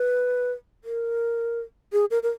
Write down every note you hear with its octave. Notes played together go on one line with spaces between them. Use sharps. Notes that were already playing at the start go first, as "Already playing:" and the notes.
Already playing: B4
A#4
G#4
A#4
A#4